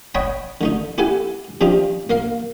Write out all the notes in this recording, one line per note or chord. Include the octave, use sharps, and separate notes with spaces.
C#5 D#5 F#5 G5 A5 B5
D3 A3 D#4
E4 G4 A4 F#5 G#5
C3 F3 D4 D#4 F4 G4
A#3 A#4 F5